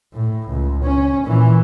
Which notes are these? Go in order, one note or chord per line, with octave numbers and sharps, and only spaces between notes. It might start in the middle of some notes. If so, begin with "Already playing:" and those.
A2
C#2
C#4
A#2 E3